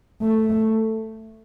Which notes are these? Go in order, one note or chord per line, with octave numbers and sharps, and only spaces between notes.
A3